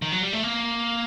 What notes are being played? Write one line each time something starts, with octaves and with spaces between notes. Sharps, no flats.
D#3
F#3
G3
A3
A#3